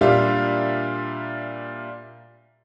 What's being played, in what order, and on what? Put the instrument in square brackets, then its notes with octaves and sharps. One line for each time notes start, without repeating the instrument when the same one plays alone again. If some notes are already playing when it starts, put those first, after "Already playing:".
[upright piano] A#2 G3 D4 F4 E5